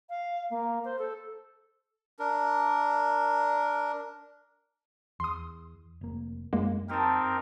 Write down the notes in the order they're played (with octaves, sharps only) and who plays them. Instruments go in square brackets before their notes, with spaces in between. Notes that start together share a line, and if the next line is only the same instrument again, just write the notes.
[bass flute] F5
A#3
C5
A4
[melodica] D4 A#4
[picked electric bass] E2 [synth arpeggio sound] C6 D#6
[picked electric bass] F1 A#3
[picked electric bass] F#2 [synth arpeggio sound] G#3 A#3
[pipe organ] C4 D#4 A#4 [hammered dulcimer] G4 A5